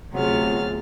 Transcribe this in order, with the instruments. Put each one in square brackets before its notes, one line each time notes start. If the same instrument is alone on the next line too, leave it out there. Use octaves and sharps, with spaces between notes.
[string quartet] D2 F6 A6 [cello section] C3 B3 F4 [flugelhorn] F#3 [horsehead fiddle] G#4